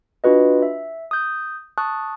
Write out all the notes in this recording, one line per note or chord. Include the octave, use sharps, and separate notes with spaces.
D4 F4 F#4 B4 D#5
E5
D#6 G6
A5 C#6 D#6 F#6